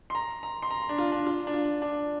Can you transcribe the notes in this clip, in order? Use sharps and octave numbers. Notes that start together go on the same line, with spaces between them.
C6
A#5
A#5
C6
A#5
D4
F4
D4
F4
D4
F4
D4